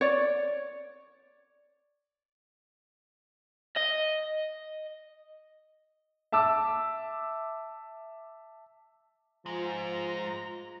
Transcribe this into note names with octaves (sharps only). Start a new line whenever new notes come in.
C#5 D5
D#5
E5 A5 D6 E6
G#2 F3 G#3 F4 A#5